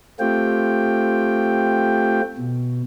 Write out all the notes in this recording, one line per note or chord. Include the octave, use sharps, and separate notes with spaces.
A3 C4 F4 G4 G5
B2